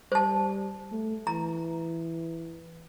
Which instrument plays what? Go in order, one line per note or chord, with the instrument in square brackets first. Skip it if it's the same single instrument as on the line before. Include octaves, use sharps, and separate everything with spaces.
[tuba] G3 [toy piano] C5 A5
[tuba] A3
[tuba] E3 [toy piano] A#5